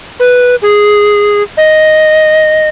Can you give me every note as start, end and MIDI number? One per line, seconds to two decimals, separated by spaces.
0.20 0.55 71
0.62 1.43 68
1.57 2.69 75